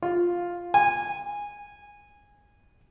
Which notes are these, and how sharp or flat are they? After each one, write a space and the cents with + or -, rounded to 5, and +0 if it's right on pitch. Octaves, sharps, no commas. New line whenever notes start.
F4 +5
G#5 -15